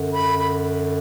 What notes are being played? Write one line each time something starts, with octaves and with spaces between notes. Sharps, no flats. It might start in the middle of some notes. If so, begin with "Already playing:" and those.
Already playing: F#2 D3
B5
B5